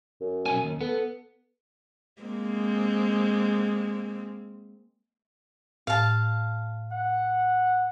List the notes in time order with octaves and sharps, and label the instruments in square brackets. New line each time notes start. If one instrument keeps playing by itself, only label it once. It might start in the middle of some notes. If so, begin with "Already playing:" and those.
[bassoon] F#2
[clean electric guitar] B1 C#4 G#5
D#2
[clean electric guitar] B3 [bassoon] A4
[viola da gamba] G#3 A#3 C4
[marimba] A2 [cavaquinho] F5 A5
[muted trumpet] F#5